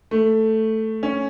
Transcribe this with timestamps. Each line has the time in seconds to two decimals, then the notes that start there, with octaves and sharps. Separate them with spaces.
0.11 A3
1.03 C#4